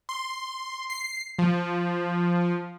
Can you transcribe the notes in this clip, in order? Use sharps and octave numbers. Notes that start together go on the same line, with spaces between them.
C6
C7
F3